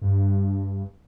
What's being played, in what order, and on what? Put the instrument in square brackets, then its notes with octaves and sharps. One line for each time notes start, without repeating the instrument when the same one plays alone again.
[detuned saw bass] G2